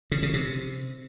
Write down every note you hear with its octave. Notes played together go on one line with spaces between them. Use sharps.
C#3
C#3
C3